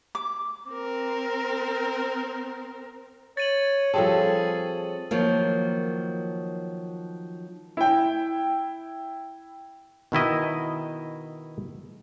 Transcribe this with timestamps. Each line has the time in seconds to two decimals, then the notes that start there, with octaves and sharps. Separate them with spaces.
0.15 D6
0.70 C4 A#4
3.37 C#5 A6 D#7 F#7
3.94 F3 G3 C4 G#4 A4 C#5 A5
5.11 D#3 F3 F#3 A#3
7.77 E4 G5
10.12 B2 D#3 E4 D#5